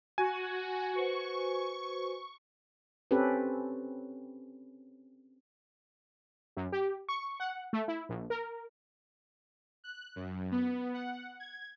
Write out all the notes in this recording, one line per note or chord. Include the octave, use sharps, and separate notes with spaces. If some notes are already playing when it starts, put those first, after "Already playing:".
F#4 G#5
F#4 B4 C5 C#6
C4 C#4 G4 A4 B4
F#2
G4
C#6
F#5
A3
E4
A#1
A#4
F#6
F#2
B3
F#5
G#6